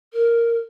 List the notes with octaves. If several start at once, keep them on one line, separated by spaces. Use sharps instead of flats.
A#4